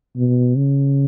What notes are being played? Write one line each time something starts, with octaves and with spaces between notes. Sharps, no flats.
B2
C#3